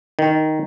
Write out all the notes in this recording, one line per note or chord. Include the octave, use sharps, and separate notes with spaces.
D#3